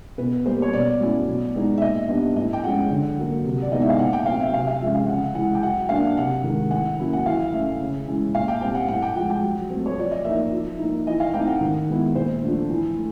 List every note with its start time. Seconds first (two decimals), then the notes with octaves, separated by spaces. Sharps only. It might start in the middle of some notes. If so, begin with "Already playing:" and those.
0.18 B2 B4
0.45 G3 A#3 C5
0.62 C#5
0.73 B2 D5
1.00 F#3 A3 C#4 E4
1.27 B2
1.55 G#3 B3 D#4
1.77 E5
1.82 A#2 D#5
2.08 G3 B3 D4 D#5
2.36 A2 D#5
2.53 G5
2.63 F3 G#3 C#4 F#5
2.90 D3
3.18 F#3 A#3
3.45 C3
3.62 D5
3.71 E3 G#3 B3 D#4 D#5
3.81 E5
3.90 F5
3.99 A#2 F#5
4.13 G5
4.26 F#3 A3 C4 F5
4.40 E5
4.53 C3 F5
4.67 F5
4.81 F3 G#3 C#4 E5
4.95 F5
5.08 C#3 F#5
5.35 E3 G#3 F#5
5.55 G5
5.62 F#3 F#5
5.89 A#3 D4 F5
6.17 C3 F#5
6.44 D#3 G#3
6.71 A2 F#5
6.99 F#3 A#3 C#4 E4
7.13 F#5
7.26 E3 F5
7.53 A3 C#4 E5
7.80 C#3
8.07 E3 G#3 C#4
8.34 A#2 F5
8.48 G5
8.61 G3 C4 G5
8.75 F#5
8.88 A2 F#5
9.02 G5
9.15 F3 G#3 F#5
9.30 G5
9.43 F#3
9.70 A3 C4
9.86 C#5
9.98 F3 D5
10.11 D#5
10.25 A#3 D#4 E5
10.52 F3
10.79 A#3 D#4
11.06 E3 D#5
11.20 F5
11.34 A3 C4 D#4 G5
11.47 F#5
11.61 D#3
11.88 G#3 B3 E4
12.15 A#2 C5
12.43 F3 A3 D4
12.70 E3
12.97 A3